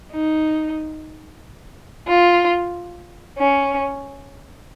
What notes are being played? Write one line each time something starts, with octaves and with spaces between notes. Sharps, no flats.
D#4
F4
C#4